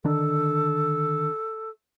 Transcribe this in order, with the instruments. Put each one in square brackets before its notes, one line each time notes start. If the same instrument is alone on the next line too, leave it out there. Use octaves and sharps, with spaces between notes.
[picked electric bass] D3 D#3 D4 [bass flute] A4